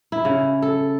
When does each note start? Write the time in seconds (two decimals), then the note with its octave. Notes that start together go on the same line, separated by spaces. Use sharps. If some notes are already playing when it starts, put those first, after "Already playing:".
0.12 E4
0.25 C#3
0.62 A4